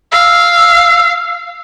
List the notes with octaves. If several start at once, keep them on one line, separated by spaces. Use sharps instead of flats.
F5 E6